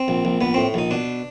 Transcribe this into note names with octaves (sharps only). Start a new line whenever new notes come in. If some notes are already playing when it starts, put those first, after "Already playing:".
Already playing: C4
A#1
A#1
A#1 B3
A2 C4
A#1 D#4
B2 D4